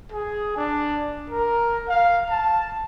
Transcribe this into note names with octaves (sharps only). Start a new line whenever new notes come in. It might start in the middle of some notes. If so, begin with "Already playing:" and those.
G#4
D4
A#4
F5
A5